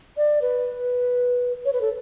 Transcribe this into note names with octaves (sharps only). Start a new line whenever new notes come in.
D5
B4
C#5
B4
A4